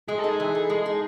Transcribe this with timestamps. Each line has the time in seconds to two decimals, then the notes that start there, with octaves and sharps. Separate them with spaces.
0.08 G#3 G#4
0.19 A4
0.24 D#4 G#4
0.40 E3
0.55 A4
0.70 G#3
0.86 D#4